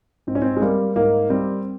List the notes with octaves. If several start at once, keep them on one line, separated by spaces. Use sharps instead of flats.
G#2 C4
C#4
C4
G#3
G3 A#3
G#2 A#3
G3 C4